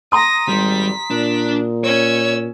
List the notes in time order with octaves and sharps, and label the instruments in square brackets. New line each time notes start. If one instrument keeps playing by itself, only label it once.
[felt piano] A#5 C6 D#6 [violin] A#6 D#7
[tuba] G#1 [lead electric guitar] G3 [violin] B6
[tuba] A#2 [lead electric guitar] D4
[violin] C#4 E6 [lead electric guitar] C#5